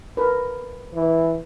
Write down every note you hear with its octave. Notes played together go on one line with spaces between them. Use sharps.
A#4 B4
E3